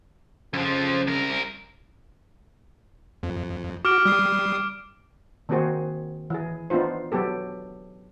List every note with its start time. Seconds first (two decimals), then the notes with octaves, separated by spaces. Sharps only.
0.54 F2 C#3 F3
1.07 C2 A#4
3.23 F2
3.85 F#4 D6 F6 D7
4.05 G3 D#6 C7
5.49 D#3 A#3 C4 F#4 G#4 C5
6.30 E3 G#4
6.70 B3 D4 D#4 F4 C5
7.12 F#3 B3 G4 A4